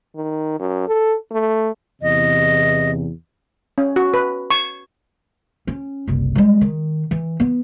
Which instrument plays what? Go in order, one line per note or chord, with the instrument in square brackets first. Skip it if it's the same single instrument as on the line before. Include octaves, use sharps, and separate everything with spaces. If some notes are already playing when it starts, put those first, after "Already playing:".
[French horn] D#3
F#2
A4
A3
[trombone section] E2 C3 [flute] D#5
[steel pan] C#4
F#4
B4
C#6
[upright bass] C#4
F#1 C2
G3 G#3
D#3
E3
B3